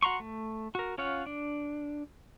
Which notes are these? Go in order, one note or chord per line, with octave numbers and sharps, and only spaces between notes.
F#4 F#5 A#5 C6 C#6
A3
F#4 A#4
C#4 F4 C#5 F5 F#5
D4